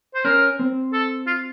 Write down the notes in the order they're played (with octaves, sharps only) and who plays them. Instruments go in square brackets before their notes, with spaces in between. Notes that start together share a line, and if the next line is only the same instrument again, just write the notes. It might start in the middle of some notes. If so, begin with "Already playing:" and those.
[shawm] C5
[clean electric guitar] C#4 [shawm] A#4
[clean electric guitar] C4
[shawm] A4
F4